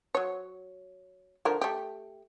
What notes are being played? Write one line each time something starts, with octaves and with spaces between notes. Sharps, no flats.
F#3 C#5
D3 F3 A#4
A3 G4